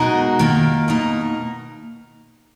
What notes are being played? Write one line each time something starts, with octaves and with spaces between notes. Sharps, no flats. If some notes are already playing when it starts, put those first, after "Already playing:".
Already playing: B2 G#3 D#4 F#4 A#4
D#3 A#3 F4
B2 A#3 D#4